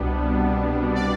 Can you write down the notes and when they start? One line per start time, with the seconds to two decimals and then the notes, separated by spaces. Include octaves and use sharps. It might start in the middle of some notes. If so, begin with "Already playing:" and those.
Already playing: C2 B2 G3 B3 D4
0.94 D5